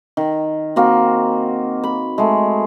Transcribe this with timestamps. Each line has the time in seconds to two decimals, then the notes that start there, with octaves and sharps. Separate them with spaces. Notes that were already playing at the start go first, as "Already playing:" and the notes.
0.17 D#3
0.76 A#3 C4 F#4
1.84 B5
2.18 G#3 A3